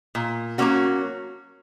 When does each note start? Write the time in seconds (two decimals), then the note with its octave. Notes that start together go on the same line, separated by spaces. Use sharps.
0.15 A#2
0.58 F#3 A#3 C#4 F#4